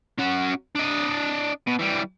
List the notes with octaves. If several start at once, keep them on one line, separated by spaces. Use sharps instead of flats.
C#4 F#4
D4 D#5
B2
E3 G3